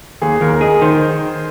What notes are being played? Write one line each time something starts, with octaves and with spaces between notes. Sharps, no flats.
D#2 G#4
D#2 A#4
G#4 D#5
D#3 C5